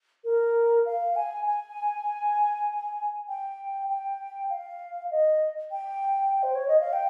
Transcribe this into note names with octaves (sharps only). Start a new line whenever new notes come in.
A#4
F5
G#5
G#5
G5
G5
F5
D#5
G5
C5
C#5
D#5
F5
G5